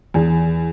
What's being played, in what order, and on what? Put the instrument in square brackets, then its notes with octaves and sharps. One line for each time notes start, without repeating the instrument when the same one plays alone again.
[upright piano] E2